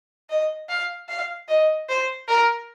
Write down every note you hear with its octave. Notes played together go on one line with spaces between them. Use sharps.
D#5
F5
F5
D#5
C5
A#4